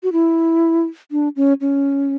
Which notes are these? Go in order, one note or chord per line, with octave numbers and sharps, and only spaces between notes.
F#4
E4
D4
C#4
C#4